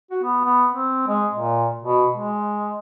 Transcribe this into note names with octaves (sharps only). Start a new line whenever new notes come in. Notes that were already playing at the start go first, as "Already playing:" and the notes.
F#4
B3
B3
C4
G#3
A#2
B2
G#3